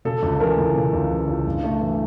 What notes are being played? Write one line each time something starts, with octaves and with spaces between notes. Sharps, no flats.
C#3 A4
C#2
E3 A#4
C#2
C#3
C#2
E3
C#2
G2
A3
E3